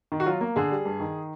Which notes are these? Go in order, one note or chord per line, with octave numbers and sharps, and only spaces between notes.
D#3
F#4
F#3 F4
A#3
D3 G#4
G3
G2
D#3